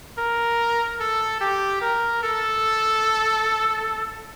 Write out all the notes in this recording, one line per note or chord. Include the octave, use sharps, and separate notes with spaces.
A#4
A4
G4
A#4
A4